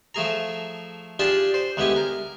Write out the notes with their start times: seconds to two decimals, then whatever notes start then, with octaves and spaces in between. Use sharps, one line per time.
0.15 F3 A3 G#4 A#5
1.19 D4 F4 G4 G#4 D5 A5
1.54 C5
1.77 D2 G#3 B3 E4 G4 G#5
1.96 A#4